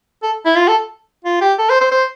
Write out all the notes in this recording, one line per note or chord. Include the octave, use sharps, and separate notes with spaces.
A4
E4
F4
A4
F4
G4
A4
C5
C5
C5